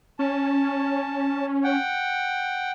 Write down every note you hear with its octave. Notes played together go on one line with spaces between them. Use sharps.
C#4 A5
F#5 G5